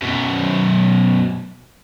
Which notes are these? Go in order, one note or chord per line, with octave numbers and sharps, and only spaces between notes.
F#2 B2